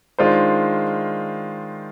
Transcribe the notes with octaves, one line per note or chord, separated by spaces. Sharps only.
D#3 G#3 D4 F4 C5